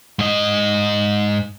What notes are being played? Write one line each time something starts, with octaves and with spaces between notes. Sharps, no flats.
G#2 D#5